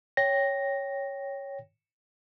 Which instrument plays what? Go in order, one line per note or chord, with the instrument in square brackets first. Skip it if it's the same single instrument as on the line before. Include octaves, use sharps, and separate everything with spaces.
[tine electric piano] C#5 G5 A#6